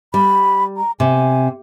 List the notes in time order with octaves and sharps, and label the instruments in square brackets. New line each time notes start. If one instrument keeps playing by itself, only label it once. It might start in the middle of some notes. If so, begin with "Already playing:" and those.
[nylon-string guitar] G3 [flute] B5
[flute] A#5
[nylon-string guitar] C3 [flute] G#5